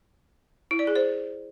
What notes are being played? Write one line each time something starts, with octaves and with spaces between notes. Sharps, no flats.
E4
D5
G#4
C5